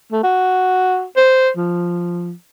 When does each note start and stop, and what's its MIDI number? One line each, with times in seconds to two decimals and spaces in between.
0.12 0.22 57
0.23 1.05 66
1.17 1.50 72
1.57 2.33 53